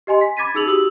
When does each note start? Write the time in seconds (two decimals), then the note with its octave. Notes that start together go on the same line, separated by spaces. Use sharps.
0.07 G4 D#5 G#5 C6
0.21 B6
0.37 B5 D6 G#6 A6 B6 D#7
0.54 D#4 G#4 E6 F7 F#7
0.66 F#4 G4 D#6 E6 F#7